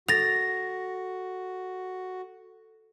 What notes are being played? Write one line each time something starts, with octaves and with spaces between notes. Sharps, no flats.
F#4 A4 A6 A#6 F7